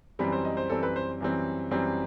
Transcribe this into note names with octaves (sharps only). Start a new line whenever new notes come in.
F#2 E3 G3 C4 B5
C5
D#5
C5
F#2 E3 G3 C4 A4
B4
C5
F#2 E3 G3 C4
F#2 E3 G3 C4